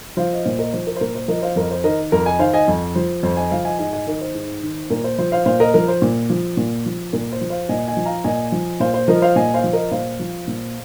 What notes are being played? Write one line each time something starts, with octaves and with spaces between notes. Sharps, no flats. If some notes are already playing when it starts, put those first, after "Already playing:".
F3 C5 F5
D#5
A#2 C5
A#4 D#5
F3 C5
A#4
C5
A#2 A#4
C5
F3 A#4 D#5
C5 F5
F2 A#4 D#5
C5
D#3 A#4 D#5
F2 A#4
D#5 G#5
D#3 C5 F5
D#5 G#5
F2
F3 C5
F2 C5
D#5 G#5
F3 C5 F5
D#5 G#5
G#2 D#5 G#5
D#5 G#5
D#3 A#4 D#5
C5
G#2
D#3
A#2 A#4
C5
F3 C5
C5 F5
A#2 C5 F5
A#4 D#5
F3 A#4
C5
A#2
F3
A#2
F3
A#2 A#4
C5
F3
C5 F5
A#2 D#5 G#5
D#5 G#5
F3
F5 A#5
A#2 D#5 G#5
F3
A#2 C5 F5
C5
F3 A#4 D#5
C5 F5
A#2 D#5 G#5
C5 F5
F3
A#4 D#5
A#2 C5 F5
F3
A#2